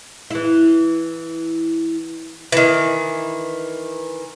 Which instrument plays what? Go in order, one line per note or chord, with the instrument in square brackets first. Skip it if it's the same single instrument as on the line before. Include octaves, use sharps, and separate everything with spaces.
[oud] E3 E4
[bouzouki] D#3 E3